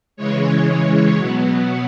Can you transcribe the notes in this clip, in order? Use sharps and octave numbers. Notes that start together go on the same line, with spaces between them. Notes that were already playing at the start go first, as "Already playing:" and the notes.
C#3 E3 G#3 C#5
B2 F#3 B3